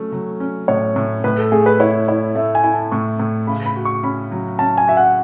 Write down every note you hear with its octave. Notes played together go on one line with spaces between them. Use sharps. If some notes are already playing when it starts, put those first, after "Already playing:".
Already playing: F#3 A3 C#4
F#3
C#4
A2 C#5
A2
A2 B4
A4
A3 G#4
B4
E4 C#5
E4 C#5
A3 E5
G#5
E4
A5
A2 C#6
A2
C#3 B5
B5
F#4
C#6
C#4 B5
F#3
C#4 A5
G#5
F#4 E5
F#5